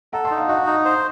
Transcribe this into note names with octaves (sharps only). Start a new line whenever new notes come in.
A4 F#5 A#5
A5 C6
D#4
F5 A5
F#4 D#5 F#5
D#4
C5